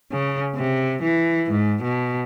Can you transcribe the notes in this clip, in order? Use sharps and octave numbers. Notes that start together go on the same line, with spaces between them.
C#3
C3
E3
G#2
B2